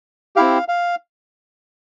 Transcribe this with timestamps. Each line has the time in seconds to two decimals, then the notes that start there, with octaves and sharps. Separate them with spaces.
0.36 C4 E4 G4 F5
0.68 F5